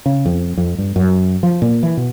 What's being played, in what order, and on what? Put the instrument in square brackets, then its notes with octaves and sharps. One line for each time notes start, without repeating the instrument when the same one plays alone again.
[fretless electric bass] C#3
F2
F2
G2
F#2
F3
A#2
E3
B2